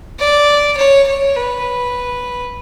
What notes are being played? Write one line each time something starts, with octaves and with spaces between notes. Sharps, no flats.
D5
C#5
C#5
B4